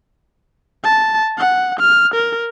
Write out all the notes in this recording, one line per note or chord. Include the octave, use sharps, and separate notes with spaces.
A5
F#5
F6
A#4